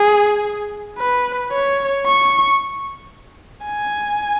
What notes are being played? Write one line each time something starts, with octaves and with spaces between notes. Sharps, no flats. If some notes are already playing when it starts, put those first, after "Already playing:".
Already playing: G#4
B4
C#5
C#6
G#5